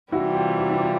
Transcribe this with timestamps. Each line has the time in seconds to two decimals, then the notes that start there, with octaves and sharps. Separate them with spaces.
0.12 C3 E3 G3 E4 F#4
0.35 F4 G4
0.58 E4 F#4
0.70 E4
0.81 F4